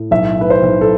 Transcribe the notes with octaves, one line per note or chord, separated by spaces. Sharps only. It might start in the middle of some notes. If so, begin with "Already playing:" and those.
Already playing: A2
B1 E5
A2 B4
C5
B1
A4